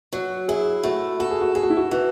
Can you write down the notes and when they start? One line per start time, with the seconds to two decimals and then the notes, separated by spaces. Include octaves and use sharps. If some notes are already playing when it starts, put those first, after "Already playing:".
0.13 F#3 F#4
0.48 E4 G#4
0.83 A3 F#4
1.19 F#4 A4
1.31 G#4
1.41 F#4
1.55 G#4 A4
1.63 F#4
1.70 E4
1.77 F#4
1.91 E3 F#4